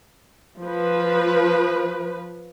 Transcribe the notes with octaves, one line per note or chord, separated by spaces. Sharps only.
F3 B4